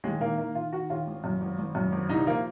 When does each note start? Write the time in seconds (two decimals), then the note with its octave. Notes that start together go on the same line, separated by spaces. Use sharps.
0.04 D#2 G#3
0.21 D#3 A#3
0.38 D#3 A#3
0.55 D#3 F4
0.73 D#3 F#4
0.90 D#2 F4
1.07 G#1
1.24 F#2
1.41 G#1
1.58 G#1
1.75 F#2
1.92 G#1
2.09 C2 D#4
2.26 F3 A#3